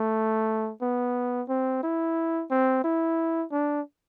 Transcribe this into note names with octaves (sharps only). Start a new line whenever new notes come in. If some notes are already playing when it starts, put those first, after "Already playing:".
Already playing: A3
B3
C4
E4
C4
E4
D4